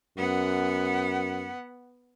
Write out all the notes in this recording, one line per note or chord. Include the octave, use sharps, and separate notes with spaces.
F#2 B3 F#5